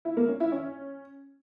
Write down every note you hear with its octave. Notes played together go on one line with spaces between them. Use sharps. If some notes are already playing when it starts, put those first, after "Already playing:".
E4
A#3
C#4
E4
C#4